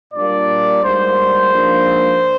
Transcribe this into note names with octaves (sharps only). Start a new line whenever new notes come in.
A#2 G3 A#3 D4 D5
G#2 G3 A#3 C5
G#2 F3 A#3 D4